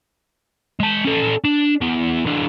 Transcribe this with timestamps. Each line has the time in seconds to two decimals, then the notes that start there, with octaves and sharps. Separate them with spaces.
0.80 G#3 A5
1.05 C#4 A4
1.44 D4
1.81 E2 B3
2.26 E3 D4